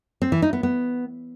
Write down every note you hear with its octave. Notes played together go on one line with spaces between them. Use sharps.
C4
E3
D#4
B3
B3